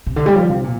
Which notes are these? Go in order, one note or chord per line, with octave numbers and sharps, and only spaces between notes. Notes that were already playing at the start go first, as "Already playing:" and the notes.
C3
D3
G3
F3
C3
A#2